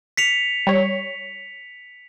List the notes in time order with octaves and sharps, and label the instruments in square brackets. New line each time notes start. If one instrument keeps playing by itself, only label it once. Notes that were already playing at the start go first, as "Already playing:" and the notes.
[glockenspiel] B6 C#7 F7
[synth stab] G3 C#5